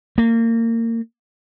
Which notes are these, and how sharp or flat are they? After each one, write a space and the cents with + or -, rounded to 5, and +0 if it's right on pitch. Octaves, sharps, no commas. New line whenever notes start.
A#3 -30